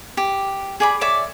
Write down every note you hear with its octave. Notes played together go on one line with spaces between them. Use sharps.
G4
G#4 D5 B5
C#5 D5 E5 D6